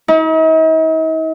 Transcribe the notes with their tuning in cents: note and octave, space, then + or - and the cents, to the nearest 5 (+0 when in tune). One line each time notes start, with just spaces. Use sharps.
D#4 +45